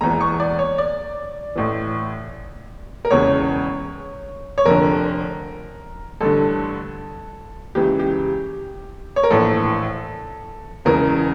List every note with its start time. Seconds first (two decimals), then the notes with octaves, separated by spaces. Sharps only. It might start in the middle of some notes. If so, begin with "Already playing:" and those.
0.01 E1 E2 E3 A#5
0.21 C#6
0.40 D5
0.59 C#5
0.78 D5
1.56 A1 A2 E3
3.05 A#4
3.11 E1 E2 C#3 E3 C#5
4.58 C#5
4.66 F1 F2 D3 A#4
6.21 A1 G2 D3 A4
7.75 C#2 C#3 E3 G4
7.99 G4
9.16 C#5
9.24 A#4
9.30 A#1 A2 E3 A4
10.85 E1 E2 C#3 E3 A#4